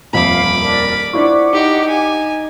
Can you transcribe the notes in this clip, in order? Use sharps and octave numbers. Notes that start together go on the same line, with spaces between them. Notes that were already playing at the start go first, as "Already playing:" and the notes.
D#1 F2 E5 F5 B5 D6
D4 A#4
D4 E4 F4 C5 D5 F#5 C#6 D6
D#4 G4 D#5
G#5